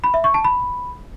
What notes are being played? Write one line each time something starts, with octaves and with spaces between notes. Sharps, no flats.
B5
E5
C#6
A5
B5